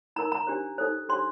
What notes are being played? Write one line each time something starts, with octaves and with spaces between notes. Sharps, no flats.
D#4 A#4 A#5
A#5
D4 G4 C5
D#4 A4 C5
D4 G4 C5 C6